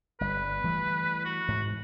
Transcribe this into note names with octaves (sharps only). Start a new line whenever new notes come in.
G1 G3 B4
E3 G3 A3
F#4
G#2